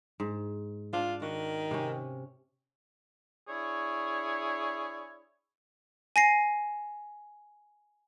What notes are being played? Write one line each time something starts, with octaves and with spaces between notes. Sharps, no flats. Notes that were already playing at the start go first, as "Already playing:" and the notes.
G#2
D4 F4
D#3 F#4
C3 C#4
D4 E4 G#4 C#5
G#5 A#6 C7